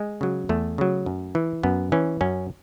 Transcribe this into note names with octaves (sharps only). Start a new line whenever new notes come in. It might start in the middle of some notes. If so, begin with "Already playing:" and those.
Already playing: G#3
C#3 F#3
E2 A3
C#3 F#3
F#2
E3
F#2 B3
E3 C#4
F#2 C#4